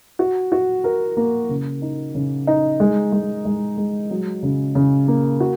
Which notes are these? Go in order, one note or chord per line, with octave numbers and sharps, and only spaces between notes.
F#4
F#4
A#4
A#3
C#3
D#4
C#3
D#4
G#3
G#3
G#3
G#3
F#3
C#3
C#3
A#3
F#4